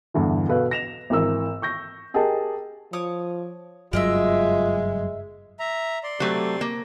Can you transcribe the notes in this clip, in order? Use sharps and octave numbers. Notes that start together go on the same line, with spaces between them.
E2 G2 D3 E3
B2 A4 B4 F5
A#6 E7 F7
G#1 E3 A#4 E6
C#6 G6 A#6
G4 G#4 A#4 D#5 G5 A5
F3 C#5 D6 D#6
F#1 G2 F#3 G#3 F4 A#4 D#5 E5
E5 A#5
D5 C6
C3 F#3 A3
A#3